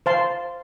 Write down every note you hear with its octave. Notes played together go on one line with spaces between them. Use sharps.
C5 F5 A5 C6